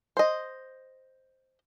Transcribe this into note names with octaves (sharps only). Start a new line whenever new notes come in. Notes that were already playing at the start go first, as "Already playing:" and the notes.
C5 D#5